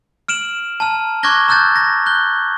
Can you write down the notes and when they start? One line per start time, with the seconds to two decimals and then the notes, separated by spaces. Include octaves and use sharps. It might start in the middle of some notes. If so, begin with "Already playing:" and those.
0.28 F6 D7 E7 F#7
0.80 A5 A#5 F6
1.23 C#6 D6 F#6 G#6 A#6 G7
1.48 A#5 E6 F#6 G6 A6
1.76 A#6
2.06 F#6 G6 G7